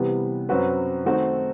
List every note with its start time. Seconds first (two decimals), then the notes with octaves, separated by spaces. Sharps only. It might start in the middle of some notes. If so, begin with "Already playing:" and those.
Already playing: C3 E3 G3 B3
0.49 F#2 F#3 C4 F#4 B4
1.05 D#3 A3 C4 D#4 F#4